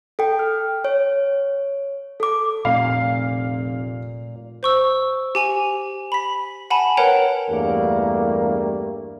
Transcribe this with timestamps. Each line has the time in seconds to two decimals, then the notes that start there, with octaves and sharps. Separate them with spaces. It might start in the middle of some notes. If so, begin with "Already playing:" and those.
0.19 A4 G5
0.39 F6
0.85 C#5
2.20 A4 D6
2.65 F1 A#2 F5
4.63 C5 C#6 E6
5.35 G4 G#5 F7
6.12 B5 B6
6.70 F#5 G#5 A5 B5
6.97 A#4 B4 C#5 F#5 G5 A#5
7.50 E2 G2 G3 A3 A#3